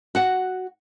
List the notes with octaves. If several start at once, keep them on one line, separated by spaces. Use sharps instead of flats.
F#4 F#5